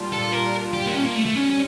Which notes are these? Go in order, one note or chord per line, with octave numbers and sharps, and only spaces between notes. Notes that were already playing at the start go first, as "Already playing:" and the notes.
Already playing: A#2 G3 D4 F4
A4
A#4
G4
A#3
C#4
A#3
A3
A3
D3 G3 C#4
C#4